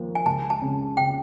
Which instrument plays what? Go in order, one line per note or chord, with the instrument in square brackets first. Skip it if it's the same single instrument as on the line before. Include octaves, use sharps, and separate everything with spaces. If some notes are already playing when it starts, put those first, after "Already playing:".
Already playing: [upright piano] D#2 F3 A#3
[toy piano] G#5
[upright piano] C#2 [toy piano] A5
[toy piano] A5
[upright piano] C#3
[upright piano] C#3 [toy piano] G5